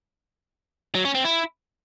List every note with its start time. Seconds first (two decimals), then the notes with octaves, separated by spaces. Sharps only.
0.95 F#3
1.05 C#4
1.15 C4
1.25 E4